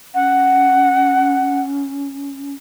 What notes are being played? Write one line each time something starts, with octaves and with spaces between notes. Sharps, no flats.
C#4 F#5